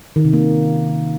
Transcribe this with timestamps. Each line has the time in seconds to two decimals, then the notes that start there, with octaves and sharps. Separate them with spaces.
0.16 D#3
0.25 C3
0.33 A#3
0.42 C#4